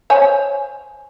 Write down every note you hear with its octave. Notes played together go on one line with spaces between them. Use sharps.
C5 C#5 G#5